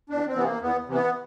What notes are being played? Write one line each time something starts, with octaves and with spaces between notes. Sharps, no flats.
E2 D4
C4
C3 E3 B3
A#3
E2 B3
C3 E3
B3